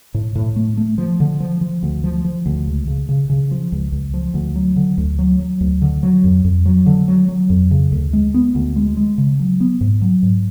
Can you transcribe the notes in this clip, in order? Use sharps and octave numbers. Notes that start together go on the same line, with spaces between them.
A2
A2
A3
A3
F3
D3
F3
F3
D2
F3
F3
D2
C#2
C#3
C#3
C#3
F3
C#2
C#2
F3
D2
F#3
D3
D2
F#3
F#3
D2
D3
F#3
F2
F2
F#3
D3
F#3
F#3
F2
C#3
D2
G#3
B3
D2
G#3
G#3
C#3
F#3
B3
G#2
F#3
G#2